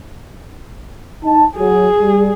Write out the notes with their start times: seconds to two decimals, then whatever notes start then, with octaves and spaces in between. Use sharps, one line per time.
1.24 D#4 A5
1.57 F#3 G#4
2.01 G3